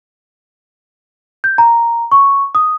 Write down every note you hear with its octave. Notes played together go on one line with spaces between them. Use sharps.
G6
A#5
C#6
D#6